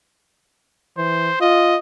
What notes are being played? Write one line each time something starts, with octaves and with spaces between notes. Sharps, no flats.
E3 C5
F4 D#5